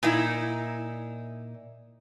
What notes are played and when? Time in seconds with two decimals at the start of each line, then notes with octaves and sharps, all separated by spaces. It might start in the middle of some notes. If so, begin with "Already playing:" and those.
0.03 A#2 D#4 E4